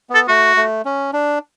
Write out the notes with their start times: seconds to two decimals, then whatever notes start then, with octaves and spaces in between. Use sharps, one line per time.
0.10 B3 A4
0.28 A3 F#4
0.56 A3
0.85 C#4
1.13 D4